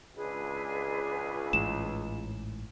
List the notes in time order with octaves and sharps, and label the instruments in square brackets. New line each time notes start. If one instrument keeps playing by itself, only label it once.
[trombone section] C#2 [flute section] D4 G#4 B4
[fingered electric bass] A1 G#2 E3 [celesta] E7